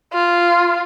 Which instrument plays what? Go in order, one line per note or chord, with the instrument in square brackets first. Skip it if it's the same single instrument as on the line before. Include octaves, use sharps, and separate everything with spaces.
[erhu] F4